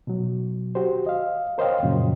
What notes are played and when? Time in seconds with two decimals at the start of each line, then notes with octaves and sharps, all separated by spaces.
0.07 B2 F#3
0.75 F#4 G4 C5
1.06 D#5 F5
1.58 A#4 C5 C#5 D#5 F5 G5
1.83 F#2 A#2 C#3 F3 F#3